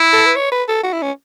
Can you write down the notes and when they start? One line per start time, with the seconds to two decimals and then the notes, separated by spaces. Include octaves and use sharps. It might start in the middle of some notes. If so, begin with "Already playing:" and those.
Already playing: E4
0.13 A4
0.26 B4
0.36 C#5
0.52 B4
0.68 A4
0.83 F#4
0.93 E4
1.02 C#4